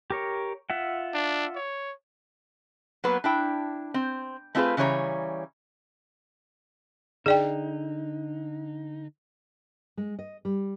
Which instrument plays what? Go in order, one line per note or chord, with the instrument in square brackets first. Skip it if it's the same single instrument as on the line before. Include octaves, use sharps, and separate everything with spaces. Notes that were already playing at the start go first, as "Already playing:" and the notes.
[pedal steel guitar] G4 A#4 C#5
F4 E5 F#5
[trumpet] D4
C#5
[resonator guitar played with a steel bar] F#3 A#3 B3 B4
D4 E4 G5
C4
A3 C4 D4 F4 G#4 B4
C#3 E3 G3 C#5 A#5
[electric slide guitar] D3 D#4 [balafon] G#4 D5 G5
[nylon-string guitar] G#3
D#5
G3